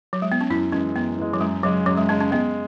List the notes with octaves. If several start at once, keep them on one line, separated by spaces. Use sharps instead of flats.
F#3
G#3
B3
C#4
F#2 E4
E3 G#3 C#4
F#2 B3
E3 G#3
F#3
F#2 G#3
C#3 F#3 G#3
F#2 F#3
G#3
C#3 G#3 C#4
C#4
G#3 B3